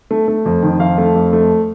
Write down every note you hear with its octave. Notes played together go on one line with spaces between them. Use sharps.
A3
A3
F2
D#3
F2 F5
A3
F2
A3